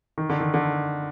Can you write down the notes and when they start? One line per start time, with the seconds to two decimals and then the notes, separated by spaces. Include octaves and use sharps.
0.18 D#3
0.30 D3
0.40 D#3
0.54 D3